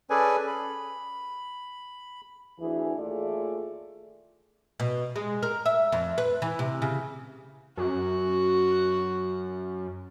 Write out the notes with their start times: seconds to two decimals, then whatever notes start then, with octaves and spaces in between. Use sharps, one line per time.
0.10 C#4 G#4 A4 B4 D5 G#5
0.47 B5
2.59 D2 E3 G#4
2.98 D#2 A3 F4 G#4 D5
4.80 B2
5.16 G#3
5.43 A#4
5.66 E5
5.92 F2
6.18 B4
6.42 E3
6.59 C3
6.82 C#3
7.77 F#2 F#4